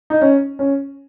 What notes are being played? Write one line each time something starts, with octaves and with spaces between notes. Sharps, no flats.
D#4
C#4
C#4